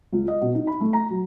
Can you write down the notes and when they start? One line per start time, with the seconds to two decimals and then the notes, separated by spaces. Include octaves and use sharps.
0.12 C#2
0.28 D#5
0.41 B2
0.55 D#4
0.67 B5
0.81 A3
0.93 A#5
1.10 F#3